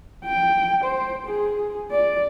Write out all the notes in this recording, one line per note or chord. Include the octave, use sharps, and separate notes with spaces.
G5
C5
G#4
D5